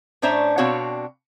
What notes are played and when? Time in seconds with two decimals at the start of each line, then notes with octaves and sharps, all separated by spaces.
0.22 A2 C#4 D4 C5 E5 A#5
0.58 B2 C4 D4 F#4 C#5 F5